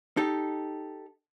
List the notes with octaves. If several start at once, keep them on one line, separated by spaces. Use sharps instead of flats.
D#4 G4 A4